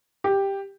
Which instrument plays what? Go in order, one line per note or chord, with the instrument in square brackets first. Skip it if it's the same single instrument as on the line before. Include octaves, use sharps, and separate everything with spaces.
[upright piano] G4